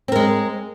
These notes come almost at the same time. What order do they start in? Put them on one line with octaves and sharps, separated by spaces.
C4 A#4 G#3